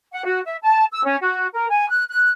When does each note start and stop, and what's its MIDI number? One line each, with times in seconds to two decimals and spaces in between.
0.13 0.24 78
0.24 0.40 66
0.45 0.56 76
0.62 0.85 81
0.92 1.03 88
1.04 1.16 61
1.21 1.47 66
1.53 1.67 70
1.69 1.87 80
1.89 2.04 90
2.09 2.30 90